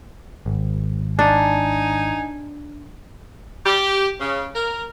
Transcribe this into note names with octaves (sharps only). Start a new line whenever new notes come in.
G#1
D4 D#4 G#5
G4
C#3
A#4